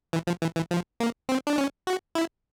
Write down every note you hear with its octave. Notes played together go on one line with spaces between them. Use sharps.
E3
F3
E3
E3
F3
A#3
C4
D4
C#4
F#4
E4